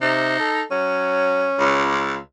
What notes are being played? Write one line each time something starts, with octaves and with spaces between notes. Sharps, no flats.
C3 D#4
A4
F#3 C#4
C#2